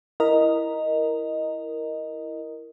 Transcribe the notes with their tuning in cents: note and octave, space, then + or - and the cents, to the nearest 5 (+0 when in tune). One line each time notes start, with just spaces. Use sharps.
E4 +0 A#4 +0 D#5 +0